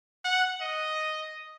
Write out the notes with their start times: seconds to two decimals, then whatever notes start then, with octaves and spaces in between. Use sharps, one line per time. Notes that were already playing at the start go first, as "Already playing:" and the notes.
0.24 F#5
0.61 D#5